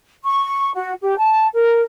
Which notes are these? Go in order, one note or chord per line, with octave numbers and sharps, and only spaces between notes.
C#6
F#4
G4
A5
A#4